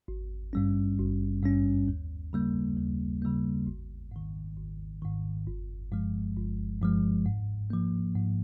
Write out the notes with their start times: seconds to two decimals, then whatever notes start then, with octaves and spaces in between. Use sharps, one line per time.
0.08 G#1
0.53 G2 G3 C#4
0.99 G#1
1.43 G2 G3 C#4
1.88 D#2
2.33 C#3 G3 A#3
2.77 D#2
3.22 C#3 G3 A#3
3.67 G#1
4.11 G#2 D#3
4.57 G#1
5.02 G#2 D#3
5.47 G1
5.92 G2 F3 G#3
6.36 G1
6.82 G2 F3 G#3
7.26 G#2
7.70 F3 A#3
8.15 G#2